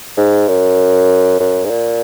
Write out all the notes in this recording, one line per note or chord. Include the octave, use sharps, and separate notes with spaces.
G#2
F#2
F#2
G#2
A#2